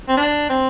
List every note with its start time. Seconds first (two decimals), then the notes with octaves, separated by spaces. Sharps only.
0.09 C4
0.17 D4
0.50 C4